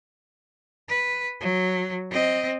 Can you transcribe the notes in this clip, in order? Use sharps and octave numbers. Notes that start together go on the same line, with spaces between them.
B4
F#3
C4 D#5